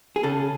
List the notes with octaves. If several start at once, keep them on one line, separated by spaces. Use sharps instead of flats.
G#4
C#3 A4